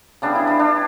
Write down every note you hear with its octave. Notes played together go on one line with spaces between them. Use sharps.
C#3 G3 B3 D4
E4
D4
D4